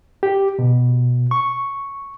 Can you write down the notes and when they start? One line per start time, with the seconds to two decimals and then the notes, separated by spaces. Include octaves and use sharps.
0.23 G4
0.59 B2
1.31 C#6